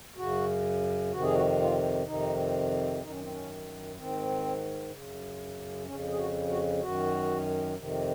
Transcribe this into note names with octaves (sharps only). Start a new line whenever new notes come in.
F#2 C#3 F#4
F2 C3 D#3 F#4
G#4
F#4
F4
F2 C3 D#3 D#4
F#2 D#3 D#4
C#4
C4
C#4
G#2 D#3 C4
F#2 C#3
F2 C#3 C#4
G#4
F#4
F#4
F#2 D#3 F#4
F2 C3 D#3